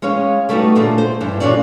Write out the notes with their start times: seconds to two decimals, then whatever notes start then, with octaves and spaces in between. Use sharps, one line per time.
0.02 G#3 C#4 C#5 F5
0.49 G3 A3 B3 D#4 F4 F#4
0.75 A#2 D3 A3 D4 G#4
0.98 C5
1.21 G2 E3
1.40 A#2 D3 F#3 C#4 D5